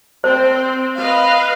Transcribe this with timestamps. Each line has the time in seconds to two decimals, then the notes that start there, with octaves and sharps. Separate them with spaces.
0.24 C4 C5
0.96 B4 D#5 F5